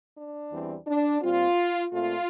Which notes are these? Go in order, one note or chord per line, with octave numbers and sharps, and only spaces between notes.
D4
E2 E3 G3 C4
D4
A#2 G3 C4 F4
A#2 A3 C4 F4